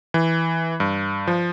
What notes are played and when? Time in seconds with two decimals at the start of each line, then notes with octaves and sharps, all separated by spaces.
0.14 E3
0.80 G2
1.27 F3